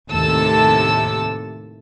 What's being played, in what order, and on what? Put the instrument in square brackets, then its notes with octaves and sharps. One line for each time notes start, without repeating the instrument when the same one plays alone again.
[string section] D#2 A2 C3 A4 A5 E6